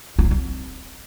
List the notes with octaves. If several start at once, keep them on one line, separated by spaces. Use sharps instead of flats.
F4
F#3
C4